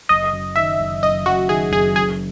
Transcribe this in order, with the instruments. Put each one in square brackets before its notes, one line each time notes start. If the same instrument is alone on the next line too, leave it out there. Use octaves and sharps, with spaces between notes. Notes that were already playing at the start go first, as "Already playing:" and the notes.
[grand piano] F#1 [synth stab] D#5
[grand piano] F#2
[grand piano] D#3 [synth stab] E5
[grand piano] F#1
[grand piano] F#1 [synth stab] D#5
[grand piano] F#2 [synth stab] F#4
[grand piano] D#3 [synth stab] G#4
[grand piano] F#1 [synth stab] G#4
[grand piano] F#2 [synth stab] G#4